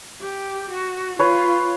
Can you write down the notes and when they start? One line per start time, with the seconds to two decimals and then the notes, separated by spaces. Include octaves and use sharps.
0.21 G4
0.71 F#4
1.19 F4 B4 C#5